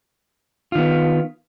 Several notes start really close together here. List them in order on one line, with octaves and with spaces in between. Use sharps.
F4 D#3 B3